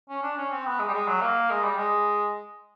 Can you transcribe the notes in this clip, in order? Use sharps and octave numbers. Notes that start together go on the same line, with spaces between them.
C#4
D4
C#4
C4
B3
G#3
G3
G#3
F#3
A#3
G#3
G3
G#3